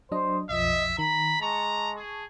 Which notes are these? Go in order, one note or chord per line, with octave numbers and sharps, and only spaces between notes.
F#3 D4 C5 D#5
B1 F2 F3 D#5 E5
D#3 A#5 B5
G#3 A5 A#5 C#6
G#4